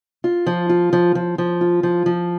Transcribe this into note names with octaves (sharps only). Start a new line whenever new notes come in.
F4
F3
F4
F3
F3
F3
F4
F3
F3